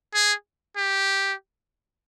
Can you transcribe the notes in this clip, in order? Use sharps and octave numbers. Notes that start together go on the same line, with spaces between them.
G#4
G4